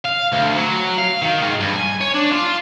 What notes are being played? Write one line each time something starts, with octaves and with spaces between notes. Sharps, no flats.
F5
D2
F#3
F5
D#3
G#2
G2
G#5
C#5
D4
F4